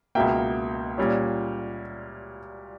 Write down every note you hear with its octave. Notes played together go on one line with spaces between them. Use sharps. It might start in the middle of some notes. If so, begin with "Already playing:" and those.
C#2 B2 A#3 E5 G5
A#2 G3 C#4